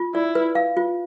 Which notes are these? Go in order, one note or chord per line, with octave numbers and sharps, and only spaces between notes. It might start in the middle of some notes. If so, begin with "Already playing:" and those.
Already playing: F4
E4 D5
B4
F5
F4